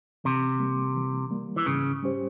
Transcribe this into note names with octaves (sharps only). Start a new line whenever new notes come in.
C3 E3
G3 A#3
E3
G3 A#3
E3
G#2 C#3
G3 C#4 G4 C5